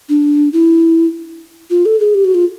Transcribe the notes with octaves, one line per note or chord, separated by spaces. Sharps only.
D4
E4
F4
A4
G#4
G4
F#4
F4